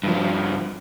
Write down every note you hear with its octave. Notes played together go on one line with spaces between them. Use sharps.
G2 F3